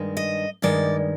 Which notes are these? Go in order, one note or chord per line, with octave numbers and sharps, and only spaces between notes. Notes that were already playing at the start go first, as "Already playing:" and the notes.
Already playing: G2 D#3 G#3
D#5
G2 D#3 G#3 D5